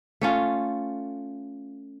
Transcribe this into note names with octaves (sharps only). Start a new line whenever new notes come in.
A3 C#4 F4